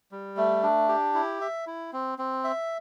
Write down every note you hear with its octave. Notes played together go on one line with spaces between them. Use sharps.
G3
A3
D4
G4
E4
E5
E4
C4
C4
E5